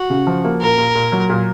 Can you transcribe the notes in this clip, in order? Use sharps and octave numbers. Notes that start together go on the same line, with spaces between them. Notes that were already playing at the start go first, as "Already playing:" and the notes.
Already playing: F#4
C#3
F3
A#3
A#2 A#4
A#2
A#2
F#3
A#2